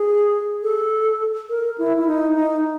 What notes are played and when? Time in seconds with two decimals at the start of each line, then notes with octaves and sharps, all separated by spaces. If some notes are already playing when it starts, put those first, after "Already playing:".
Already playing: G#4
0.63 A4
1.49 A#4
1.78 E4
1.97 E4
2.07 D#4
2.36 D#4